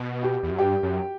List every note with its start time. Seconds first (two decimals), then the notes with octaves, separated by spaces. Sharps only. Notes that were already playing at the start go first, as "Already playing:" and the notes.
Already playing: B2
0.23 G4
0.43 E2
0.51 F#2
0.58 G2 G4
0.83 F#2